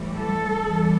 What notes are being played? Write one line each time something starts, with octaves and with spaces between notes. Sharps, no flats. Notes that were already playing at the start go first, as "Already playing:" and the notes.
Already playing: A2 E3 G3
A4
E2 E3 G3